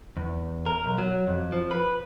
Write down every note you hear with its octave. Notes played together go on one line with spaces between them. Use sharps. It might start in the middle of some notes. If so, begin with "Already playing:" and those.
E2
A#4
B1
F#3
F2
F3
B4